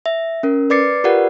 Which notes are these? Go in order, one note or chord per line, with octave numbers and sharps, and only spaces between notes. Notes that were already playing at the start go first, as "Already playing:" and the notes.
E5
C#4 A#4
B4 D5 D6 A6 C7 C#7
F4 G4 A#4 B4 D5 F#5